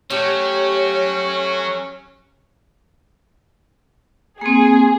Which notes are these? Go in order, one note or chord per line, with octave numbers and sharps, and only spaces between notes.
F#3 A3 C#4 G4 C#5
A#3 C4 G#4